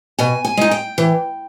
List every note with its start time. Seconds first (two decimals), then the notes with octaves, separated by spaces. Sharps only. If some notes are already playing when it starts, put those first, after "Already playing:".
0.19 B2 G#5
0.45 G#5
0.57 G#3 D#4
0.71 G5
0.98 E3